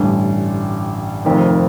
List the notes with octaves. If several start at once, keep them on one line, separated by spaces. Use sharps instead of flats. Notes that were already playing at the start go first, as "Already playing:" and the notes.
Already playing: A1 G2 D3 G3
F1 F2 D#3